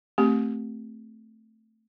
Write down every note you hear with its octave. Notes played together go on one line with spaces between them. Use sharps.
A3 C4 G4